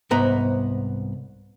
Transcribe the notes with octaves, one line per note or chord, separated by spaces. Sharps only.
C2 G#2 B3 A#5